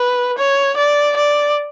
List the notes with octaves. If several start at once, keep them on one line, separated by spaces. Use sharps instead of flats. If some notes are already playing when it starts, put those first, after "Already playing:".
Already playing: B4
C#5
D5
D5